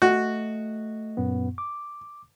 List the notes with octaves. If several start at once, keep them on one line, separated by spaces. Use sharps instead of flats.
A3 F#4 D#5
F#2 A#2 B3
D6